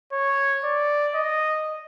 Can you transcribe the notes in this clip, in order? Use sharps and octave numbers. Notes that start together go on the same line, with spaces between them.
C#5
D5
D#5